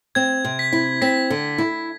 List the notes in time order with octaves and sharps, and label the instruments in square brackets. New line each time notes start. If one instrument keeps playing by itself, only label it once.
[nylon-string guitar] C4 [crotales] G#6
[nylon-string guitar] C3
[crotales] B6
[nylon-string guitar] E4
[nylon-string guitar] C4 [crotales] B6
[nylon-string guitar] D3
E4